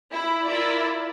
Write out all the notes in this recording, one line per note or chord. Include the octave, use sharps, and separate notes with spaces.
E4
E4 F4 A#4 D5